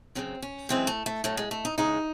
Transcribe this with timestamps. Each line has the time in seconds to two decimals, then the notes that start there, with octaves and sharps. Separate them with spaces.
0.15 F#2 C#3 F#3 C4
0.42 C#4
0.69 F#2 E3 G#3 C4
0.87 A3
1.06 A3
1.24 A2 F#3 A3
1.37 G#3
1.51 A3
1.65 D#4
1.78 E2 C#3 G#3 D#4